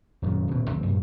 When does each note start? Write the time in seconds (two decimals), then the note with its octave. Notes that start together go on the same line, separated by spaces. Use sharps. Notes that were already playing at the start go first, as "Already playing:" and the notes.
0.22 D#1 F#2 A#2
0.48 D#1 B2
0.70 D2 F3 G#3 C4
0.86 F#2 A#2